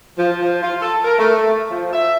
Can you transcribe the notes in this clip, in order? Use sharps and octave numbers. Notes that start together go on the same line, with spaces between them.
F3
F3
F4
A4
A#4
A3
A3
F3
E5